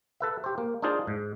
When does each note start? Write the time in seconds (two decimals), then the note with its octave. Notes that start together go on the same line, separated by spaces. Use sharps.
0.20 A4 B4 E5
0.44 G4 C5
0.58 A#3
0.82 D4 D#4 F4 G#4 C5 D5
1.07 G#2